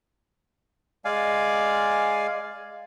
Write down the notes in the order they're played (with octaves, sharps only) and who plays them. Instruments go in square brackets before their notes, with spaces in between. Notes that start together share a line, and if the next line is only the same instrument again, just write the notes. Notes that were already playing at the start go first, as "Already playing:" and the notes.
[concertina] G#3 D5 F5 G#5